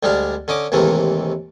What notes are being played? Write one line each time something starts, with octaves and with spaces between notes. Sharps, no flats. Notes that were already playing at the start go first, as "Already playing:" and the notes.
D2 G3 G#3 D4 F5
D3 C#4 D#5 D6
D#2 G#2 C3 E3 A3 A#3